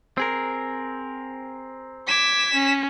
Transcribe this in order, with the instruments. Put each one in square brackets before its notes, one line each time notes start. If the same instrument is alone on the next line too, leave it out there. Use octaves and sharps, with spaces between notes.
[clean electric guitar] C4 G#4 A#4
[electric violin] D6 G#6 [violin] B6 E7
[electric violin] C#4